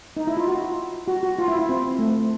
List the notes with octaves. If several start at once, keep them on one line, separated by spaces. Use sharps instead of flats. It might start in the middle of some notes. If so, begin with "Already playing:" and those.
D#4
E4
F4
F#4
F#4
F#4
F4
E4
E4
C4
A3